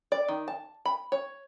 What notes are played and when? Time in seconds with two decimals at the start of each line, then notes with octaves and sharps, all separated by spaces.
0.12 D5
0.28 D#3
0.48 A5
0.85 B5
1.12 C#5